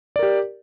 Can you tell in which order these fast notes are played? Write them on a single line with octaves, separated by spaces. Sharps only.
D5 A#4 G4